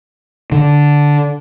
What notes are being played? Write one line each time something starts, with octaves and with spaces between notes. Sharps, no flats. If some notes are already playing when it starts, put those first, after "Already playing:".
D3